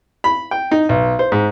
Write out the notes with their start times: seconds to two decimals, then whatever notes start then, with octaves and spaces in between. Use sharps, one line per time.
0.24 B5
0.51 G5
0.72 D#4
0.89 B1
1.19 C5
1.32 G#2